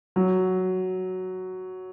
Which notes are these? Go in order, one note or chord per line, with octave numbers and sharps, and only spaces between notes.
F#3